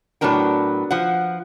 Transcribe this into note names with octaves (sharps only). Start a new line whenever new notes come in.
A2 F#3 B3 D4 A#4 G5
F3 F#5